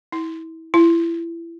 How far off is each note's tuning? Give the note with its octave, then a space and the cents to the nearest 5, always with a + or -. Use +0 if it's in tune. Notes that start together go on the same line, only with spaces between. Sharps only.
E4 -25
E4 +25